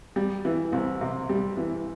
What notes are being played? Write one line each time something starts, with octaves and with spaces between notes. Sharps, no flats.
G3
E3
C2
C3
G3
E3